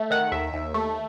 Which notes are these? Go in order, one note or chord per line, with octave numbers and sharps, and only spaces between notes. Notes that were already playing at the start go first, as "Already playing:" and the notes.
Already playing: A3
D#3 F#5
D#2 E5
D#2
A3